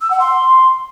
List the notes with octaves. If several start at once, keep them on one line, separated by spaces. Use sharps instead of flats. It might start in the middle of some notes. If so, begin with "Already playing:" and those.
E6
F#5
C6